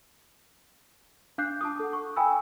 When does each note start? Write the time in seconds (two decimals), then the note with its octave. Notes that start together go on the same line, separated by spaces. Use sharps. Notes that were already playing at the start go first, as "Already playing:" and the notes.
1.38 D4 F5 D6 F#6 G6 C7
1.61 A5 D6 D#6
1.80 A4 F#5
1.93 C#6
2.16 F5 G5 G#5 B5 D#6 E6